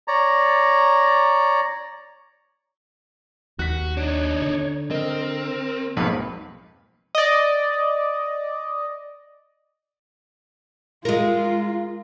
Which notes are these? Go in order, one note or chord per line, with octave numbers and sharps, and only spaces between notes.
C#5 D5 A#5
D#2 F#4 F#6 B6
D4 D#4 C#5
D3
C4 A#4 D#5
B1 F2 G#2 A#3 F4 B4
D5 D#5
G#3 F4 A#4